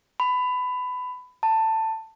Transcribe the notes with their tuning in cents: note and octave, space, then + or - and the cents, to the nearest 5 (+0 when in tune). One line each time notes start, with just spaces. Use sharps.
B5 +20
A5 +15